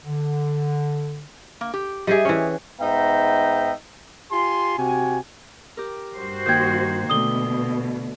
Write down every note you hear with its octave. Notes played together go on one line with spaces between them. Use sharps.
D3
A#3
G4
G3 G4 G#4 D#5 E5
E3 C#4
G#2 B3 D#4 E5 G5 A#5
F4 G4 G#5 C6
C3 F#4 G5 G#5
G4 A#4
G2 F#4 C5
D#3 A#3 G5 G6 G#6
B2 D3 A3 D#6 G7